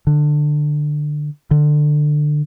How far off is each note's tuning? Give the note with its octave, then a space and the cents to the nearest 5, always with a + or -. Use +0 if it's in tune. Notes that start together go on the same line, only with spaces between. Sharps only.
D3 +15
D3 +20